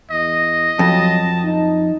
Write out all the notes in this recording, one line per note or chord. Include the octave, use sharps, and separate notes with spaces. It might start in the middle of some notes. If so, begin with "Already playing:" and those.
E2 D#5
F2 F#3 A5
D#4